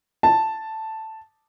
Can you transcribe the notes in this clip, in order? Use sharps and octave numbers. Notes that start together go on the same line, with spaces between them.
A5